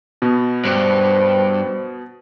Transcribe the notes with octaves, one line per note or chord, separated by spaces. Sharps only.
B2 B3
G2 C5